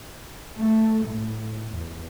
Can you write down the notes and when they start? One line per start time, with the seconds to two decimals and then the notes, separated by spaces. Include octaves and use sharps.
0.58 A3
1.08 A2
1.72 E2